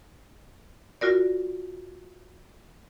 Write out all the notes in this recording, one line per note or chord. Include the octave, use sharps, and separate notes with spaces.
F4 F#4 A#4 D5